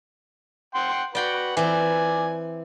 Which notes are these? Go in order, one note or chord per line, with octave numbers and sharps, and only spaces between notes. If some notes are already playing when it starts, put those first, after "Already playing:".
F#5 G5 C6
F#4 B4 D5 F#5 G5 C6
E3 C4 D5 G#5